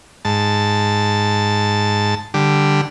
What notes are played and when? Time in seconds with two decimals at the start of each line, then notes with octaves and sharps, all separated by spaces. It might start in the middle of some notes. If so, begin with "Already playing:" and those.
0.25 G#2 A5
2.34 D3 G3